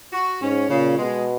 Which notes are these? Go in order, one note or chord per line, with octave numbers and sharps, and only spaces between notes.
F#4
G#2 C#4
A#2 C#3
B2 G#3